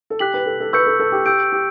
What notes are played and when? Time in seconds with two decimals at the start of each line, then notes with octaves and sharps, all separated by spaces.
0.10 A4
0.19 G4 F#6 B6 F#7
0.34 B4
0.46 A4
0.60 A4
0.73 B4 C#6 E6 G6 C#7
0.87 A4
1.00 A4
1.12 G4
1.25 G4 E6 G6 D7
1.52 G4